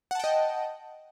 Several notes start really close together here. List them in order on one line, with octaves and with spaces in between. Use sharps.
F#5 A5 G5 D#5